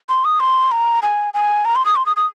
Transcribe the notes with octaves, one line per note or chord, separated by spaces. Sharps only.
C6
D#6
C6
A#5
G#5
G#5
A#5
C6
D#6
C6
D#6
D#6